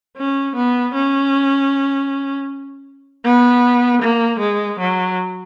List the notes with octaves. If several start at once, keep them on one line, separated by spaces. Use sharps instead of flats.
C#4
B3
C#4
B3
A#3
G#3
F#3